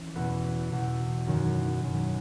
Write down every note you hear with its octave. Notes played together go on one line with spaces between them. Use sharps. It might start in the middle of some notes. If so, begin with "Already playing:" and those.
Already playing: E3 C#4
E2 B2 B3
E2 B2
F#2 D#3
F#2 D#3